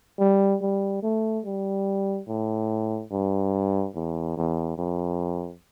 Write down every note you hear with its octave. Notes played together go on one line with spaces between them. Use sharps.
G3
G3
A3
G3
A2
G2
E2
E2
F2